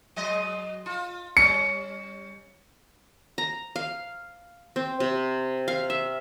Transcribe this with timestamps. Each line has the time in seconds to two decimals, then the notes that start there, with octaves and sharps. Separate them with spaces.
0.16 F#3 G#3 D#5
0.86 F4
1.37 G3 C#4 C#7
3.38 A#5
3.76 F5
4.76 C4
5.00 C3
5.68 F5
5.90 E5